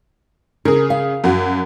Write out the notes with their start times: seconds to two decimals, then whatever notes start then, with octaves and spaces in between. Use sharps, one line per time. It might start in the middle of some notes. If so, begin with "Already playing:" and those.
0.65 C#3 G#4 A#4
0.90 F5
1.24 F#2 F#4